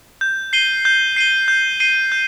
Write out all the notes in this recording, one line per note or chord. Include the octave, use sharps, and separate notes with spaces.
G6
C7 D#7 G7
G6
C7 D#7 G7
G6
C7 D#7 G7
G6